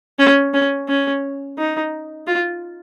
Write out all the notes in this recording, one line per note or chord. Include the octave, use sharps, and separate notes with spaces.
C#4
C#4
C#4
D#4
F4